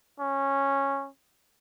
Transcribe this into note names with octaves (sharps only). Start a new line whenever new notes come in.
C#4